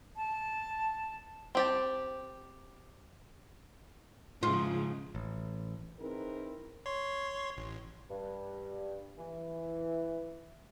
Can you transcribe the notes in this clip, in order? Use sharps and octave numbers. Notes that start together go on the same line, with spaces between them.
A5
C4 G4 A5
G#2 C#3 F3 F4
A1
C4 D#4 E4 G#4 A#4 B4
C#5 C6
A1
G2
E3